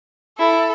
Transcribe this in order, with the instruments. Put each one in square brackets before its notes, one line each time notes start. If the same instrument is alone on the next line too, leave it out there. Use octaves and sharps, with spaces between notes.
[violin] E4 [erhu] A4